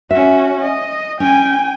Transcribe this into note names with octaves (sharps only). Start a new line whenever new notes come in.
C#4 F#4 E5
D#5
C#4 G5 G#5